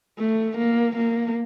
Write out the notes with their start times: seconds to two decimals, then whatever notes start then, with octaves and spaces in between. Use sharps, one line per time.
0.19 A3
0.58 A#3
0.96 A#3